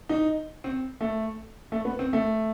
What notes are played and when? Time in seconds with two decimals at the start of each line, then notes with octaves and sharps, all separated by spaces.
0.09 D#4
0.64 C4
1.01 A3
1.72 A3
1.85 B3
1.99 C4
2.13 A3